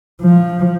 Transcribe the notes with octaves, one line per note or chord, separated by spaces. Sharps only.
F3